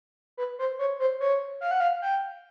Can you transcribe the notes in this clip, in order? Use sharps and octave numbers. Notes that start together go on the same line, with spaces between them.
B4
C5
C#5
C5
C#5
F5
F#5
F5
G5